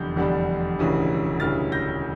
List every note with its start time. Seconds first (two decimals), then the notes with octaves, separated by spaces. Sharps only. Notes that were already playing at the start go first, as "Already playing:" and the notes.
Already playing: F1 E2 D3 G3 D4 G6
0.16 F1 E2 D3 G3 D4
0.79 E1 D2 C#3 E3 G3
1.40 E1 D2 C#3 E3 G3 F6 A6
1.72 G6 A#6